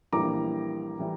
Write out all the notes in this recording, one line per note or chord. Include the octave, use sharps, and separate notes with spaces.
A#1 A2 E3 G3 A#3 A#5 D6
A2 E3 G3